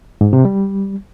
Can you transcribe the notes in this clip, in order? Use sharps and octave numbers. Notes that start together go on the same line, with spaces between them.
G#2
C3
G3